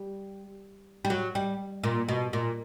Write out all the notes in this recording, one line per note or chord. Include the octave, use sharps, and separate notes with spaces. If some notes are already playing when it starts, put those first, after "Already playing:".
Already playing: G3
G3
F#3
G3
A#2
B2
A#2